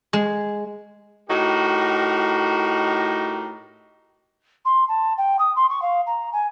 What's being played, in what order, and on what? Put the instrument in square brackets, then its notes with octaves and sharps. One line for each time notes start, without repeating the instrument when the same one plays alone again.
[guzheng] G#3
[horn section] A2 D#4 F#4 G4 A#4
[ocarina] C6
A5
G5
D#6
C6
C#6
F5
A#5
G#5